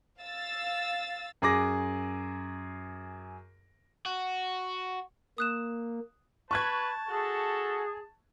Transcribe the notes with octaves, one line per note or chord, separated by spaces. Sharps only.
F5 E6 A6
F#2 G#4 D6 A#6
F#4
A#3 D#6 F#6 E7
B4 A5 C#6 F#6 G#6
F#4 G#4 A4